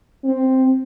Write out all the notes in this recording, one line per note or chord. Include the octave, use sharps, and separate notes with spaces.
C4